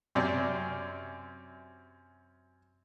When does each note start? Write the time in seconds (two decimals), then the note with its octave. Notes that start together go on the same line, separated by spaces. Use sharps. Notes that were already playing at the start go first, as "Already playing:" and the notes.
0.15 F#2 C3 D5